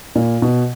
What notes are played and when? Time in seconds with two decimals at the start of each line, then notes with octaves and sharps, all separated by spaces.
0.15 A#2
0.42 B2